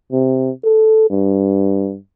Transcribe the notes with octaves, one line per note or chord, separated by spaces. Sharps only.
C3
A4
G2